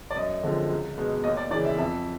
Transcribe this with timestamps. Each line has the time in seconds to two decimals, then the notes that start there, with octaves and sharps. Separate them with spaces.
0.11 D5
0.16 F#2 D#5
0.43 D3 F3 G#3 C4
0.70 C#2
0.97 B2 G#3 B3
1.24 D#2 D#5
1.37 D5
1.51 C#3 E3 D5
1.65 E5
1.78 F2 E5